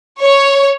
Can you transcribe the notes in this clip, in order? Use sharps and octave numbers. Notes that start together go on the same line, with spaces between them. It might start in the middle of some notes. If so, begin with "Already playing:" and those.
C#5